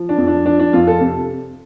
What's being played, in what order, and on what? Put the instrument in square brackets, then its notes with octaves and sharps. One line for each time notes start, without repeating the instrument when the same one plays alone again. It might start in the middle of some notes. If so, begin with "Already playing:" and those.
Already playing: [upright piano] F3
D4
F2
D4
F3 D4
D4
F2 F4
A4
C3